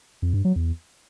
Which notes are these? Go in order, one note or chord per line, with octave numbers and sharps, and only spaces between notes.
F2
G2
F#3
E2